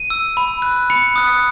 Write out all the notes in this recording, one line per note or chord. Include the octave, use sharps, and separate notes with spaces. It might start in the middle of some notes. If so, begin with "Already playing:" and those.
Already playing: D#7
E6
B5
F#6
B5 C#7
D#6 F#6